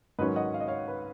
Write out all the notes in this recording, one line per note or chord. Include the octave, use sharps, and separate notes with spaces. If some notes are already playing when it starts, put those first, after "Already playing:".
G#2 D#3 F#3 C#4 B4 D#5
D#5 F#5
F5
D#5
C#5 F5
B4